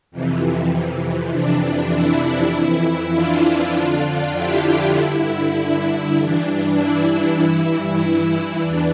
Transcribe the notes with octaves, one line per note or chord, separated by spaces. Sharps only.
F2 C3 E3
F2 C3 E3 D4
E4
F2 E3
D4 F4
F2 D3
E4 G4
G2 D3 E4
G2 E3 D4
E4
G2 E3
E2 E3 D4